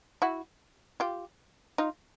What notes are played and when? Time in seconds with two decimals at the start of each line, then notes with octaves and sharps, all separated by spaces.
0.22 E4 F#4
1.00 F4 G4
1.78 D#4 F4